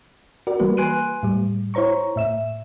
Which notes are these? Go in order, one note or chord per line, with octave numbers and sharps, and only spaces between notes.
F#4 A#4 D5
E3 G3 A#3 F#4 B4
B4 G#5 C6 F#6 D7 D#7
A2 G3
E4 C5 C#5 A#5 C#6
A2 E5 E7